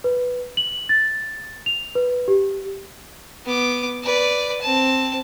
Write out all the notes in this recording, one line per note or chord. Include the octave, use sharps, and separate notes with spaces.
B4
F#7
A6
F7
B4
G4
B3 D6
B4 D5
C4 A5